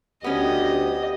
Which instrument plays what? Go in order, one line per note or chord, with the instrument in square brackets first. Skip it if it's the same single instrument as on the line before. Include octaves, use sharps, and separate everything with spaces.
[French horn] D2 [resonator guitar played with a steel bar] B3 C#4 [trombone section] G4 [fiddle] D#5